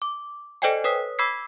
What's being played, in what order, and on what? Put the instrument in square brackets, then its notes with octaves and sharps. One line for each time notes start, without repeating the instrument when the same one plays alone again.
[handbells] D6
A4 C5 D5 D#5 G5 G#5
B4 C#5 D#6 B6
B5 D6 E6 G#6 B6 C7